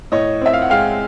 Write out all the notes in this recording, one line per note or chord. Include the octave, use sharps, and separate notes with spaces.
A2 C#5 D#5
C4 E5
F5
F#5
G#3 F5 G5